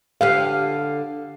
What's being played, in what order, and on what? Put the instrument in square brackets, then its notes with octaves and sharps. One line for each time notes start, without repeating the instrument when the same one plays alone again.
[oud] D3 G4 B4 [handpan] F5